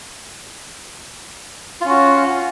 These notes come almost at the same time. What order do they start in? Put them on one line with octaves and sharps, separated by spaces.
F4 C#4 F#4